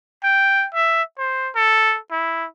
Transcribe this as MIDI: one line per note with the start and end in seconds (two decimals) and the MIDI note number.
0.24 0.66 79
0.74 1.02 76
1.18 1.50 72
1.55 1.98 69
2.11 2.46 64